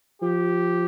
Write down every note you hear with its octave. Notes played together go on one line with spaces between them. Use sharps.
F3 G4